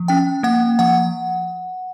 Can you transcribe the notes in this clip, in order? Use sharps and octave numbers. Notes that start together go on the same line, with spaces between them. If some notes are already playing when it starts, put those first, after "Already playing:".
Already playing: F3
C#4 G5
A#3 F#5
F3 F#5